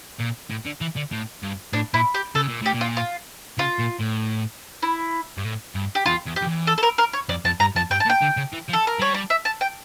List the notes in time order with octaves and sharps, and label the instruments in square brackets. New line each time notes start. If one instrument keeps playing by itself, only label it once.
[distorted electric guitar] A#2
A2
D3
E3
D3
A2
G2
[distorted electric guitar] A2 [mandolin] D4
[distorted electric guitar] A#2 [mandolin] E4
[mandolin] G4
[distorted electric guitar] C#3 [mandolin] A4
[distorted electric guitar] A#2
[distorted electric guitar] A2 [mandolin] G4
[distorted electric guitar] A#2
[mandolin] F4
F4
[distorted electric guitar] C#3 [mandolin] F4
[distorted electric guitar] A#2
A2
[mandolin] E4
[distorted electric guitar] G2
A2
G2
[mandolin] G4
[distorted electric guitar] E2 [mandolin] F4
[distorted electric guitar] E2
[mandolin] G4
[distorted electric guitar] F2
E2
[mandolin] A4
A4
A#4
A#4
C#5
[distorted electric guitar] F2 [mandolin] D5
[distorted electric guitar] F2 [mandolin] A5
[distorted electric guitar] G2 [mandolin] A#5
[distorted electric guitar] F2 [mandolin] A5
[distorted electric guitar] G2 [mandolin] G5
[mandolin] A5
[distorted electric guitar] A#2
[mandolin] G5
[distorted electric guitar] D3
C#3
E3
F3
[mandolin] A4
A#4
[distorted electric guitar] G3 [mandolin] C#5
[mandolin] D5
E5
A5
G5